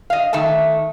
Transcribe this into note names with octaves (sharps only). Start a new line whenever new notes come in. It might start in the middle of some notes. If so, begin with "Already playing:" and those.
D#5 F5
D#3 A3 E5 A5